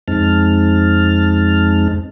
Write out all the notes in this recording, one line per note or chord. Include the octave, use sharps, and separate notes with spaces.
F2 G#3 C4 D#4 A5 F6